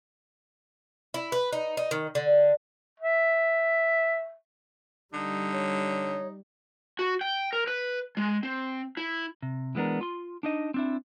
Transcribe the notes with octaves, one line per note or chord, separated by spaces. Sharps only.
E4
B4
D#4
D#4
D#3
D3
E5
D3 G3 D#4
C#5
F#4
G5
A#4
B4
G#3
C4
E4
C3
E3 G#3 B3 D4 A#4
F4 C6
D4 D#4 D#5
C4 D4 E4